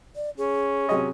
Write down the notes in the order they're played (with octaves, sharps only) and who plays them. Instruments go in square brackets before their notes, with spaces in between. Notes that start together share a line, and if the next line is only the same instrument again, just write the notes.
[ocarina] D5
[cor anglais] C#4 [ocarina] G#4
[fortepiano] C3 F#3 D#5 [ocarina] G#4